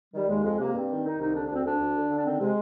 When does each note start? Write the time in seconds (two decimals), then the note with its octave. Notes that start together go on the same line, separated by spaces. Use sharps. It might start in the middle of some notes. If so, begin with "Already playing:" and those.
0.14 D#3 G3
0.29 D#2 G#3
0.44 F2 G#3
0.60 C3 A#3
0.75 G2 C4
0.89 D#3
1.05 D#3 D#4
1.19 C2 D#4
1.34 D3 D4
1.45 D4
1.50 D2
1.55 C4
1.65 D2 D4
1.80 D2
1.96 D3
2.10 D3
2.17 D4
2.25 D#3 C4
2.40 C3 G#3